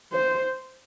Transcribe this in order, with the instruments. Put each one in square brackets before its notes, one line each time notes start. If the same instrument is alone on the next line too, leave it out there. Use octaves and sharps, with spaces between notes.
[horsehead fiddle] C5